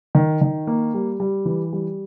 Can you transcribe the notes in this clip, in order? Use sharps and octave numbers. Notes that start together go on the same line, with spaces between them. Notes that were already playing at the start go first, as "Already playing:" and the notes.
D#3
D#3
A#3
G3
G3
E3
G3